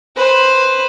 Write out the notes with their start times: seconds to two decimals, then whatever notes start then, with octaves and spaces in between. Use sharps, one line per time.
0.16 B4 C5